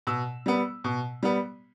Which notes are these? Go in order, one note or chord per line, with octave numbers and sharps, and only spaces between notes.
B2 E6
G3 B3
B2
G3 B3